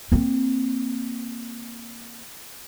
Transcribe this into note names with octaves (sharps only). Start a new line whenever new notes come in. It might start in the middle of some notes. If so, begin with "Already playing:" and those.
A#3 C4